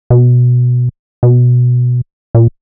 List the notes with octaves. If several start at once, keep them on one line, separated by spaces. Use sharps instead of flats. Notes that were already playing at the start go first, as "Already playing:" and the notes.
B2
B2
A#2